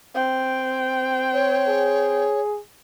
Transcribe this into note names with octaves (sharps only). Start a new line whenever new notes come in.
C4 G5
C#5
G#4